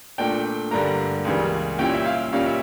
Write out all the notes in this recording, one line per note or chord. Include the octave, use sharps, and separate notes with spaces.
A#2 A3 D4 G5
G2 D3 G3 A#3 A#5
C#2 C#3 E3 G3 A#3
A#2 G3 C#4 E4 G5
E5
F5
A#2 G3 C#4 F5
E5